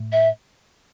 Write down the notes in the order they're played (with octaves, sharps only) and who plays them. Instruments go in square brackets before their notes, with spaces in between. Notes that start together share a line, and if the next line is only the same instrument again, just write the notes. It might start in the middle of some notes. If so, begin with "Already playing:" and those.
Already playing: [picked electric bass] A2 A3
[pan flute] E5